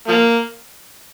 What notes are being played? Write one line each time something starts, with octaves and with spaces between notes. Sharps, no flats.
F3 A#3